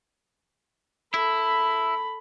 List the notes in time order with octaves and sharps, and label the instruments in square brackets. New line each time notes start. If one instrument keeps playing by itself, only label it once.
[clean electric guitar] E4 [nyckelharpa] A4 B5